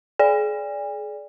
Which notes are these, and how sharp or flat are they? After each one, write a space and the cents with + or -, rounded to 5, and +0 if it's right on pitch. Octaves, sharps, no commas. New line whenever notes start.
G#4 +35 D5 -10 G#5 -45